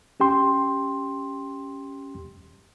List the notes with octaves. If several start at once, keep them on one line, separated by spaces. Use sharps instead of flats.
C#4 G4 G5 C6